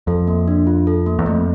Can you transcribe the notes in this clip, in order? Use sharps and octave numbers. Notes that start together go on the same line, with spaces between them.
F2 A4
A#3
D4
F4
A4
A#3
E2
F2 A3